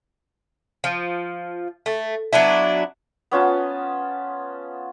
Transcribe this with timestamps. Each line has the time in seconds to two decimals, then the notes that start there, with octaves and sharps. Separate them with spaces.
0.84 F3
1.86 A3
2.33 F#3 B3 D4 E4
3.31 B3 C#4 F4 A5